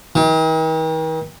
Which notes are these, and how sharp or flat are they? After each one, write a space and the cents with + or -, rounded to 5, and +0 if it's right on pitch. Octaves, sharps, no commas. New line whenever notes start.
D#3 +45